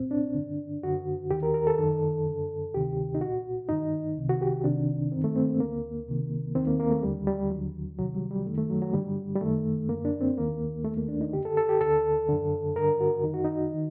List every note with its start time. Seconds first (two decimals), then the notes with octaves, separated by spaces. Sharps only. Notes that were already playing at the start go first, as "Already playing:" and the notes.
Already playing: C2 A#2 C4
0.11 D4
0.35 G2 D3
0.83 F#2 D3 F#4
1.31 D#2 D#3 G4
1.43 A#4
1.54 A#4
1.67 A4
1.78 F#2 D#3
2.26 F#2 D3
2.74 D2 C3 D#3 G4
3.15 D#4
3.21 C2 A#2 F#4
3.69 G2 D#3 D#4
4.17 C2 C3 D#3
4.29 F#4
4.41 G4
4.64 C2 C3 D#3 D4
5.12 G2 D#3 C4
5.24 A3
5.36 C4
5.48 A#3
5.59 D2 D3 A#3
6.07 C2 C3 D#3
6.55 D#2 D#3 C4
6.67 A#3
6.79 A#3
6.91 A3
7.03 D#2 D3 G3
7.27 G3
7.50 D#2 D3 F#3
7.99 C2 C3 D#3 F#3
8.14 G3
8.31 G3
8.46 F#2 D#3 A3
8.58 A3
8.70 F#3
8.82 F#3
8.93 G2 D3 G3
9.35 G3
9.41 F#2 D#3 A3
9.89 F#2 D3 A#3
10.05 D4
10.21 C4
10.37 D#2 D#3 A#3
10.84 D#2 D#3 A3
10.97 A#3
11.08 D4
11.21 D#4
11.33 F#2 D3 G4
11.45 A4
11.57 A4
11.69 G4
11.81 D2 D3 A4
12.29 F#2 D3
12.75 G2 D3 A#4
13.00 F#4
13.23 F#2 D#3 D#4
13.34 F#4
13.44 D#4
13.74 D#3